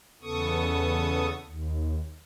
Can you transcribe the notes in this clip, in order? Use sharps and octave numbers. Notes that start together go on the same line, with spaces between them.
E2 C#3 B3 A4 C#6 D#6
D#2